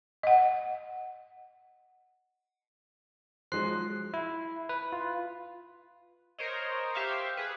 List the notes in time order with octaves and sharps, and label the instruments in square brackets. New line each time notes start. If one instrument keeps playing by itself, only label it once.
[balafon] D#5 F#5
[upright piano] F3 F#3 G#3 [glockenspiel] C6 F#6 C7
[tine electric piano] E4
B4
F4
[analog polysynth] A#4 C5 C#5 D#5
G4 C5 E5 F5 C#6
G#4 B4